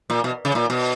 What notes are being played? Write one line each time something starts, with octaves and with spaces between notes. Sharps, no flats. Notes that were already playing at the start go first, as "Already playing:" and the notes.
A#2
B2
C#3
A#2
B2